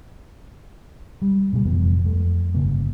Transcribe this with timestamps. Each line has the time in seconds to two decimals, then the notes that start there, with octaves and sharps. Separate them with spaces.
1.22 G3
1.53 A#2 C#3 G3
1.65 F1 F2 E3 B3
2.04 F2 A3
2.54 G1 C#3 A#3